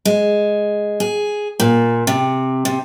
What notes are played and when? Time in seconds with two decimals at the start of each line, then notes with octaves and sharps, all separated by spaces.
0.05 G#3
1.00 G#4
1.60 A#2
2.07 C3
2.65 C3